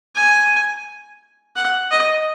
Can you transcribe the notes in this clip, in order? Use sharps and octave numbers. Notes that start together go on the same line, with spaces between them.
G#5
F#5
D#5